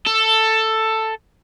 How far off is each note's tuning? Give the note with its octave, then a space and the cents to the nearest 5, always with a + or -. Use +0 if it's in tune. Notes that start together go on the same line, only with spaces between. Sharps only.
A4 +10